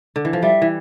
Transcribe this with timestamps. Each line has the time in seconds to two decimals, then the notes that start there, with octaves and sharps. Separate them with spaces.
0.16 D3
0.25 E3
0.33 F3
0.42 G3 E5
0.62 E3